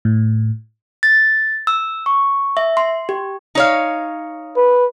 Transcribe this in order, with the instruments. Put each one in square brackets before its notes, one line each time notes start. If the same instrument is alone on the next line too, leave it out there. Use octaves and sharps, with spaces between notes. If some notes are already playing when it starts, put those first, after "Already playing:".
[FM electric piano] A2
[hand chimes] A6
E6
C#6
E5
C6
G4
[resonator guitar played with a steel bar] D#4 C#5 F5
[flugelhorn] B4